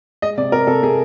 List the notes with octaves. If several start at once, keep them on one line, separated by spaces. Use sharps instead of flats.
G#3 D#5
C3 D5
C3 A#4
C3 A4
C3 G#4